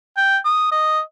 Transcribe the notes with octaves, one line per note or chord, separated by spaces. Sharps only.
G5
D#6
D#5